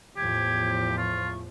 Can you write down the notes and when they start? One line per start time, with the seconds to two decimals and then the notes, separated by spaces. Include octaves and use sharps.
0.17 E2 A2 F3 G4 G#6
0.97 F4 C#6